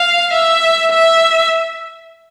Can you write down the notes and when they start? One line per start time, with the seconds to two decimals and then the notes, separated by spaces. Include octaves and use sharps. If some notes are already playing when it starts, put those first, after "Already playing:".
Already playing: F5
0.33 E5
0.92 E5